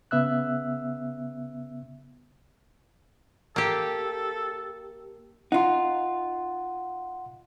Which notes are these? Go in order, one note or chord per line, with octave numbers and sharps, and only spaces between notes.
C#3 B3 E5 E6 F#6
A#3 G4 A4
D#4 F4 F#5 C6